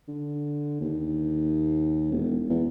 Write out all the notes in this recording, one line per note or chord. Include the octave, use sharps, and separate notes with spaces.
D3
D#2
E1
E2